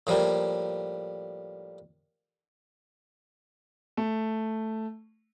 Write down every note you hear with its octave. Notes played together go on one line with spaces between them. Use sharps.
A2 F3 G3 A#3
A3